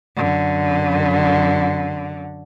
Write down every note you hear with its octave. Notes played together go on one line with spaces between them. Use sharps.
F#2 D3